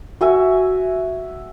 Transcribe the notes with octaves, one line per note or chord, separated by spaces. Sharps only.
F#4 E5 G#5